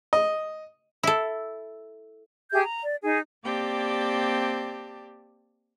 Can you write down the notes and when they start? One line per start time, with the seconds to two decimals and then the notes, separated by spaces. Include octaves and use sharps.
0.13 D#5
1.03 E4 A4
2.52 G4 G#4 E5 G6
2.63 A#5
2.83 D5
3.02 D#4 G#4
3.43 A#3 C4 G4 D5 G5 A5